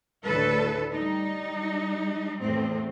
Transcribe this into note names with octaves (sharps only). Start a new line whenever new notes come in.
D2 A2 A4 B4
G3 D#4
E2 A2 C4